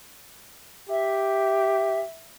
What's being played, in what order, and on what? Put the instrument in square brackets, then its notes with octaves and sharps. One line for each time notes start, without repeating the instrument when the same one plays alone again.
[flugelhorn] G4 [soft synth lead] E5